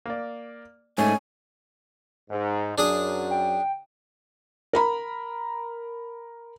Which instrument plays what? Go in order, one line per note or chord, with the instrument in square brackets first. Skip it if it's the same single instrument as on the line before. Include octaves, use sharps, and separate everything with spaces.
[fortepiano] A#3 D5
[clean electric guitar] G#2 A3 [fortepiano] C#4 [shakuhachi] G#5
[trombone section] G#2
[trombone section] F#2 F#3 [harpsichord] D4 G#4 D#6
[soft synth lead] G5
[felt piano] A#4 A#5 B5